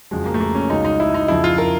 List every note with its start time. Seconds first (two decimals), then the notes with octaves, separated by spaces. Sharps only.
0.11 F2 C#3 F#3 G#3
0.26 A#3
0.34 A3
0.40 A#3
0.55 C#4
0.70 C#2 C#3 F#3 D#4
0.85 D#4
1.00 E4
1.14 D#4
1.28 F2 C#3 F3 E4
1.44 F4
1.58 A#4